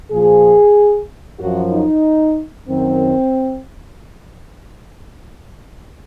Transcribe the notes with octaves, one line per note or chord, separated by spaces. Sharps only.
A#2 F3 G#4
F#2 F3 F#4
D#4
F#2 D#3 C4